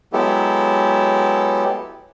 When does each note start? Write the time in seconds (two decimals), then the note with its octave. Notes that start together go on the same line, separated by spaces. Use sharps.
0.13 F#3 G#3 B3 E4 G4 A4